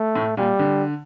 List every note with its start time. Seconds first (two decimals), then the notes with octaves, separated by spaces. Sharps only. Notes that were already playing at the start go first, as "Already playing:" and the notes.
Already playing: A3
0.16 A2
0.37 A#2 G3
0.59 D3